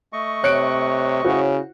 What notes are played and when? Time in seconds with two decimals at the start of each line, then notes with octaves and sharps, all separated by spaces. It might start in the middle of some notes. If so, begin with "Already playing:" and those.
0.13 A3 D#5 C#6
0.44 C3 C#5 F#6 C#7 D7
1.24 C#3 E4 F#4 C5